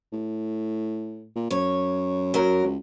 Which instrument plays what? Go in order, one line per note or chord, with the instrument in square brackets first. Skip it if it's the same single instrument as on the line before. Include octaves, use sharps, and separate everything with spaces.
[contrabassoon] A2
A#2
[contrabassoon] F#2 [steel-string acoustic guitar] C#5
[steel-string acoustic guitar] F#3 A#4
[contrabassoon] C#2